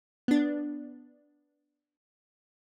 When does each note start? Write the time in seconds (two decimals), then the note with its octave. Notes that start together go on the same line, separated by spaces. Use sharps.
0.28 B3 D4